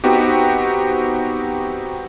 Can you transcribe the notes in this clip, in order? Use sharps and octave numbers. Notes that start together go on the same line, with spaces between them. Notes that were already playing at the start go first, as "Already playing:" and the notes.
B3 C4 D#4 F#4 G4